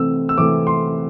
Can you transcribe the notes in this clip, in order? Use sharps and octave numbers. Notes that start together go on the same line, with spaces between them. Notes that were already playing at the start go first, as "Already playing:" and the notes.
Already playing: C3 E3 A3 C4 E6
E6
C3 E3 A3 C4 E4 D6
C6